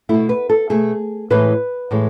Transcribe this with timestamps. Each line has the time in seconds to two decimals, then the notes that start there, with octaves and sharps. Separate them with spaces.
0.09 B2 A3 E4
0.29 B4
0.50 A4
0.70 B2 A3 G#4
1.30 A2 E3 G#3 B4
1.91 A2 E3 G#3